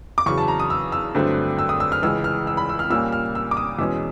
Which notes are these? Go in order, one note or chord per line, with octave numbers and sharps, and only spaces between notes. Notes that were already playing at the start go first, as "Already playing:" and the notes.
D6
E2 C#3 F#3 C#6
A5
A#5
D#6
E6
E6
G2 D3 F#3 A3 C4
E6
D#6
E6
F6
C#2 C#3 E3 G#3 E6
F6
E6
B5
E6
F6
A#2 G3 A#3 C#4 E6
F6
E6
D6
D#6
E2 B2 G#3 C#4 E6